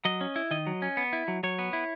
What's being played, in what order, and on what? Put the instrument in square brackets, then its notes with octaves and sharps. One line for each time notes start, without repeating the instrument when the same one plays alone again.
[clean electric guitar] F#3 D#5
C#4
E4
D#3 D#5
F#3
C#4
B3
E4
F#3
F#3 C#5
B3
E4